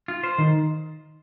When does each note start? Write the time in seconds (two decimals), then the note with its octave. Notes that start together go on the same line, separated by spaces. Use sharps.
0.08 F4
0.23 C5
0.38 D#3